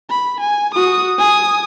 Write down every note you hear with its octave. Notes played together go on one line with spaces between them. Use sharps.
B5
G#5
F#4 D#6
G#5 D#6